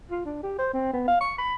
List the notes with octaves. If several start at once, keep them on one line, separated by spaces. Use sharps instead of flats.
F4
D4
G4
C5
C4
B3
F5
C#6
B5